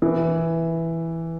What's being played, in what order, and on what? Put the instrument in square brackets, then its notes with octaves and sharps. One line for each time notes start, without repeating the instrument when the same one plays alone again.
[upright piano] E3